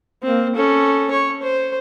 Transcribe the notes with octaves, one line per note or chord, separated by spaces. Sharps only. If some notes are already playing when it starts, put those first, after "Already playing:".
A#3 C4
C#4 A4
C#5
C5